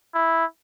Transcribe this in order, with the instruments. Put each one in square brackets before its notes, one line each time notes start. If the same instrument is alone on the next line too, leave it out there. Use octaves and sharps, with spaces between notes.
[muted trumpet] E4